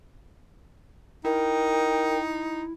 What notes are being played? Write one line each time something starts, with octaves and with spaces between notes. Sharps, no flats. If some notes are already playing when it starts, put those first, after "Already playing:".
D#4 E4 A#4 G5